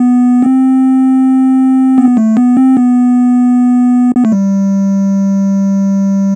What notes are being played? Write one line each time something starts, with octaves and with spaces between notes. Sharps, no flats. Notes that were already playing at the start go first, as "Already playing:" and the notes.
Already playing: B3
C4
B3
A3
B3
C4
B3
B3
A3
G3